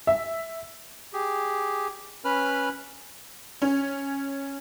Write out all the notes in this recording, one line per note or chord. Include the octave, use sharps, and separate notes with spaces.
E5
G4 G#4
C#4 B4 B5 F6
C#4